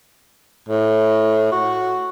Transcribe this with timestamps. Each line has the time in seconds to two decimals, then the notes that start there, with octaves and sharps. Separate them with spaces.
0.69 A2
1.52 F#4